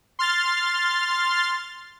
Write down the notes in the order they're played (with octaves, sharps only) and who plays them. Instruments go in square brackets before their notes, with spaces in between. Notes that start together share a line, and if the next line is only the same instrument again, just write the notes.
[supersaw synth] C6 F6 A6